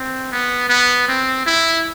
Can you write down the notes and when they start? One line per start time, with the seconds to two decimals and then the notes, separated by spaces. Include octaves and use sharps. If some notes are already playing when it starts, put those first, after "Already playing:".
Already playing: C4
0.32 B3
0.69 B3
1.08 C4
1.46 E4